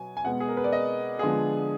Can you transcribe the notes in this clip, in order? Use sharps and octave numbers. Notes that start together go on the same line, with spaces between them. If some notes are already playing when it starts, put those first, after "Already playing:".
Already playing: B2 F#3 B3 G#5
G#5
B2 G#3 B3 F#5
G#4
A#4
B4
D5
D#5
D3 F3 G#3 B3 G#4